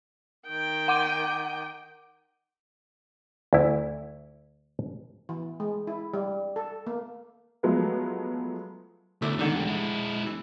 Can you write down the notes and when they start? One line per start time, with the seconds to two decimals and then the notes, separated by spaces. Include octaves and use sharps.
0.48 D#3 G5
0.88 F#5 D6 D#7
3.53 D2 E4
5.29 E3
5.60 G#3
5.87 E4
6.14 G3
6.56 A4
6.87 A#3
7.63 F3 F#3 G#3 A3 B3
9.22 D2 A3 E4 D6
9.39 G#2 D3 D#3
9.55 E2 G4
9.67 G#3 E4
10.26 E3